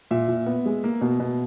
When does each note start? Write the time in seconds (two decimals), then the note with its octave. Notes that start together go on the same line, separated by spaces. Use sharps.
0.11 A#2 E5
0.28 A#2
0.46 B3
0.66 G#3
0.84 A#3
1.01 B2
1.20 B2